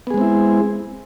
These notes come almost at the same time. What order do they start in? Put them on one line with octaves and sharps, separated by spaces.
B3 G#4 G#3 C4 E4